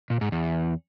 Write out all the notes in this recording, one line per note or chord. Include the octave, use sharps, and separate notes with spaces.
A#2
G#2
E2